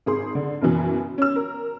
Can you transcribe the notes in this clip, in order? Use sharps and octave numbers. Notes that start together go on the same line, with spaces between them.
G#1 G#4 C6
D3
F#1 F#2 B2 E3
C#4 E6
A#4